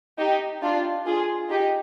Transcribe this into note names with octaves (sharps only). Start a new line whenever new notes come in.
D#4 G4
D4 F4
F4 G#4
D#4 G4